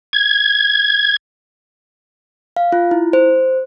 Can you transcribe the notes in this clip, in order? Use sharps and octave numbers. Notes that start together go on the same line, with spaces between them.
G#6
F5
F4
E4
C5